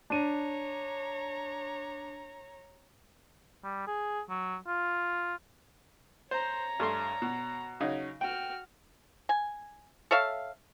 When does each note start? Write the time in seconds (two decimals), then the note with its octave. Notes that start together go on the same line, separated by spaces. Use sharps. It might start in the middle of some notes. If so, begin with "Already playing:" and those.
0.10 D4 C#5 A#5 D#7
3.64 G3
3.87 G#4
4.30 F#3
4.67 F4
6.31 C5 C#5 A#5
6.80 G2 A3 C6
7.22 B2
7.80 C#3 F#3 D#4
8.21 F#4 G5 F6
9.29 G#5
10.11 A4 C#5 E5 F5